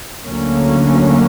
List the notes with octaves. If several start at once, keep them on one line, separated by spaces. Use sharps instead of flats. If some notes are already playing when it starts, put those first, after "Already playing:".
D2 D3 F#3 A#3 C#4